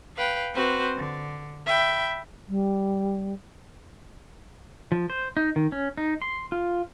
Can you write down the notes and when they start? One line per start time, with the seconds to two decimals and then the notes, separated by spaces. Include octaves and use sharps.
0.17 B4 F5 G5
0.54 C4 F#4 B4 C5
0.96 D3
1.66 E5 G5 B5
2.48 G3
4.92 F3
5.10 C5
5.37 D#4
5.56 D#3
5.72 C#4
5.98 D#4
6.22 C6
6.52 F4